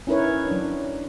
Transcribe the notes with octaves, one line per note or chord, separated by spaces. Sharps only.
C#4 D#4 E4 A#4 B4 C#5
F#3 D4